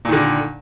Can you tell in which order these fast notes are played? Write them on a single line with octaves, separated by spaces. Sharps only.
A#2 D#3 D3